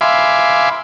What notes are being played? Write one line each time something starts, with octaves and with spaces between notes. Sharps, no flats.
E5 F5 G#5 B5 C6 D6